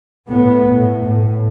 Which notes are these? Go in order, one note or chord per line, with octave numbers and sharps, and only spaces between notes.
A2 B3
A2
A2